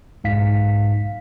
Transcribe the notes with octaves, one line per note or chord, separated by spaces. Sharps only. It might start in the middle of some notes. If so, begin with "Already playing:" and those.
B1 G#2 F5 B6